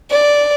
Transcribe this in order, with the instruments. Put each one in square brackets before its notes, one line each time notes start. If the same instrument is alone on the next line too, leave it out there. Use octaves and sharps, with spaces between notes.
[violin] D5